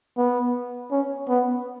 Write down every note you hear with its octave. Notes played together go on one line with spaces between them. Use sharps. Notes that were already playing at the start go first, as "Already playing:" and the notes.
B3
C#4
B3